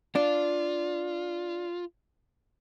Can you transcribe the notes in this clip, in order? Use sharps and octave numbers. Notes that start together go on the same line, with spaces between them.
D4 F4